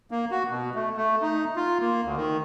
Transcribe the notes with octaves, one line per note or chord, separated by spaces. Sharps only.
A#3
F#4
B2
A3
A3
D#4
F4
A#3
D2
D#3